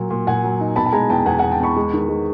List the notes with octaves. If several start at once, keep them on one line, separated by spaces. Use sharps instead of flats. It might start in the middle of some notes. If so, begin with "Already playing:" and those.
Already playing: A#2 F#3
A#2
A#2 F#5 G#5
F#3
D#4
B2 A5 B5
A5
G#3 G#5 A#5
E2 G5 A5
E2 F#5 G#5
E2 F#5 G#5
G5 A5
E2 B5 C#6
G#3
D#3
G#3